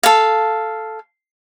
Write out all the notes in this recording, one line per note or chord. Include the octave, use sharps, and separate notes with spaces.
A4 F5